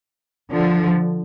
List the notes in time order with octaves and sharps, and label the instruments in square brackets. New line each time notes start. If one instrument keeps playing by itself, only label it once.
[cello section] D3 F3